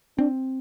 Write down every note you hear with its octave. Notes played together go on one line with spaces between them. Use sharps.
C4 D4